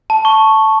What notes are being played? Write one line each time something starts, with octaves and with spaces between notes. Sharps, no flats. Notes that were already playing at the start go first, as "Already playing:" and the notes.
A5
C#6